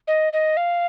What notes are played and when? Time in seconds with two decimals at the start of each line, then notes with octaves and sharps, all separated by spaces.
0.07 D#5
0.33 D#5
0.57 F5